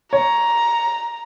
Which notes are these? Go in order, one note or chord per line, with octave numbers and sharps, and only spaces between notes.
C#5 A#5